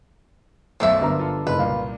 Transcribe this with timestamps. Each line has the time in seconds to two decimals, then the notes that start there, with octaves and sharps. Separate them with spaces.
0.80 B1 F#2 F3 A3 D4 E5
1.01 G1 A#4 A#5
1.19 F4 A4
1.47 F#1 B4
1.59 C2 A#2 F5